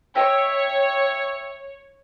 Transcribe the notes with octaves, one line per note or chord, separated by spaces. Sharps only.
C#5 D#5 E5 G5